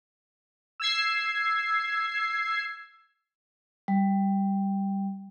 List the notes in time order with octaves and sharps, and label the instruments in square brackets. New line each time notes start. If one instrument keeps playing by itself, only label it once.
[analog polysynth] E6 G#6 C7
[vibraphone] G3